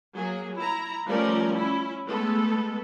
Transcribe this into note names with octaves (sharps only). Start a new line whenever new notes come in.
F#3 A#3 G#4
E4 A#5
F3 G3 A3 C#4 A#4 D5
C#4 E4
G#3 A3 B3 A4